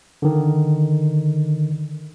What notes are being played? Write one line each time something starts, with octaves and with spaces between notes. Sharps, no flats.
D3 D#3